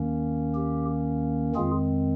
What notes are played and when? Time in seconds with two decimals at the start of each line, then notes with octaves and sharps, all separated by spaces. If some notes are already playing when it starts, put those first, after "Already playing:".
Already playing: D#2 D#3 A#3 C#4
0.55 G4
1.55 F2 D#3 G#3 C4 F4 G#4